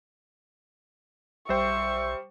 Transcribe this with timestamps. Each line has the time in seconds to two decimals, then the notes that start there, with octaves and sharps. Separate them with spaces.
1.49 B1 G3 C5 E5 G5 C#6